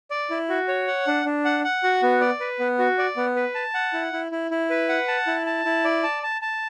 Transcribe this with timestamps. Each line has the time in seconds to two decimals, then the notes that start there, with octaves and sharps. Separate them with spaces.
0.11 D5
0.30 E4
0.49 F#4
0.68 C#5
0.87 F#5
1.07 D4
1.25 D4
1.45 F#5
1.64 F#5
1.83 F#4
2.03 B3
2.21 D5
2.40 B4
2.59 B3
2.79 F#4
2.98 D5
3.17 B3
3.36 B4
3.55 A5
3.74 F#5
3.93 E4
4.13 E4
4.32 E4
4.51 E4
4.70 B4
4.89 F#5
5.08 A5
5.27 E4
5.46 A5
5.65 E4
5.85 D5
6.03 A5
6.23 A5
6.42 A5